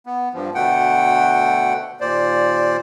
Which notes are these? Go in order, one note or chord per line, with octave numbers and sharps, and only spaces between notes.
B3
G2 F3
D2 B2 A3 F#5 G5
D#2 A#2 C5 D5